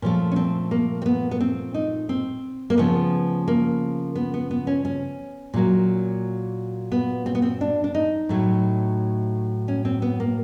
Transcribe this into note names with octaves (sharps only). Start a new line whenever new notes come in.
A#2 F3 A3 C#4
C#4
C4
A#3
C4
B3
B3
C4
D#4
C4
A#3
C#3 F3 A3 B3
A#3
B3
B3
B3
C#4
C#4
A#2 F#3 A#3
B3
C4
B3
C4
D4
D4
D#4
A2 F#3 A3
C#4
C4
B3
A#3